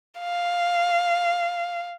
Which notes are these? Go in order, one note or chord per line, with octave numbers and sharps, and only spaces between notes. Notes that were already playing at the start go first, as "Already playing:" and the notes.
F5